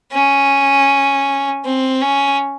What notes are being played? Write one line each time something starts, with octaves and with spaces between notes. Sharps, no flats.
C#4
C4
C#4